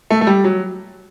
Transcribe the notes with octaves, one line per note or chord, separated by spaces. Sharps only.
A3
A3
G3
F#3